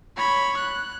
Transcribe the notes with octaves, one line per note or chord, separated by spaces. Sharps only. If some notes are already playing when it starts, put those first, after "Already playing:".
C#5 B5
F#6